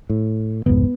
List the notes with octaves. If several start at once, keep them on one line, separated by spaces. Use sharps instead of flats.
A2
F1 C#2 G#2 B3